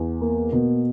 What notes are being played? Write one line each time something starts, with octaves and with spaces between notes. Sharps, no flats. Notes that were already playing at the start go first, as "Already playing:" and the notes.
Already playing: E2
A#3
B2